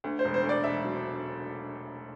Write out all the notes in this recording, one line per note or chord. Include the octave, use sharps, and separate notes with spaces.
D2
C5
E1
C5
D2
D5
E1 E5
F#3